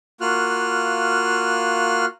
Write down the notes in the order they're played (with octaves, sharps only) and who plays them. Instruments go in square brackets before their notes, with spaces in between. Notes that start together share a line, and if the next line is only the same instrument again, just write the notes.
[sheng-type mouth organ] A#3 F4 F#4 F6 F#6